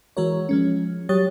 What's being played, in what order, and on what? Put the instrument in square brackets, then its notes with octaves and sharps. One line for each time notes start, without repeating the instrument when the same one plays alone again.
[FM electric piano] E3 G#3 F#4 A#4 C#5
F3 G#3 C#4
F#3 G4 C#5 D#6 A6